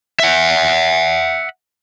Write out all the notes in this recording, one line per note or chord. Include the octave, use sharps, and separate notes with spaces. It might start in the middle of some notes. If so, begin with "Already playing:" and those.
E5 F#5